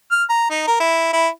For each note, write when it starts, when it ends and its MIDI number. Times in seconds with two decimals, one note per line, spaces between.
0.11 0.24 89
0.30 0.46 82
0.51 0.66 63
0.67 0.76 70
0.80 1.09 64
1.13 1.28 64